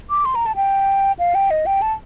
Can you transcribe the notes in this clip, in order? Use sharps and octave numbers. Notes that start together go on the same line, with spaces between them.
D6
C6
A#5
A5
G5
F5
G5
D#5
G5
A5